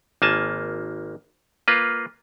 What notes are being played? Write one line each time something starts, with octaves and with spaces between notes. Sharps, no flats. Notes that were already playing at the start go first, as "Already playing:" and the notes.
G#1 A#3 G#5 A5
A#3 F4 B4